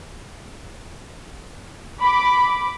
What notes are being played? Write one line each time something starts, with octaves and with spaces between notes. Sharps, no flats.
B5 D6